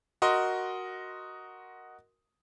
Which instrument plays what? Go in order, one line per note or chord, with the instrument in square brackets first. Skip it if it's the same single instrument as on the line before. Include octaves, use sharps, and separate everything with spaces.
[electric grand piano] F#4 A#4 D#5 C6